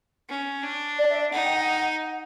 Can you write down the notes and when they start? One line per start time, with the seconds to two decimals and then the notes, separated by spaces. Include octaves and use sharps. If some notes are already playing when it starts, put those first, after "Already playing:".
0.29 C#4
0.63 D4
0.98 D5
1.10 E5
1.32 D#4 F#5
1.44 G5
1.55 F#5
1.67 F#5
2.02 F#5